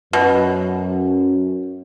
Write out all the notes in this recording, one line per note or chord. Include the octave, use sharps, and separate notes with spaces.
F#2 B2